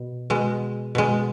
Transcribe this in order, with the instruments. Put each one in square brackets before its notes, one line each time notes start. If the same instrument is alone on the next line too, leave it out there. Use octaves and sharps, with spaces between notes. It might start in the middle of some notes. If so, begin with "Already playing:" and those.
Already playing: [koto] B2
B2 G#3
B2 G#3